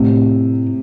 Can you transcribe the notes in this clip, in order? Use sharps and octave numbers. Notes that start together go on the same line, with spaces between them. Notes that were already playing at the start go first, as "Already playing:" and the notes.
Already playing: A2 C3